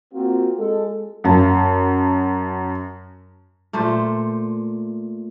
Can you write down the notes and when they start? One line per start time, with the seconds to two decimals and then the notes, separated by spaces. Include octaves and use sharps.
0.13 A#3 C4 F4 F#4
0.58 G#3 A4
1.24 F#2 A5
3.73 A#2 A3 C5